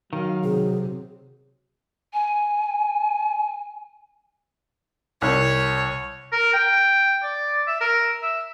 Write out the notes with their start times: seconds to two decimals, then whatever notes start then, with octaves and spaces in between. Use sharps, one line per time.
0.13 D#3 F#3 F5
0.44 C3 G#4
2.13 G#5
5.22 C2 C#5
6.32 A#4
6.53 G5
7.23 D5
7.67 E5
7.81 A#4
8.22 E5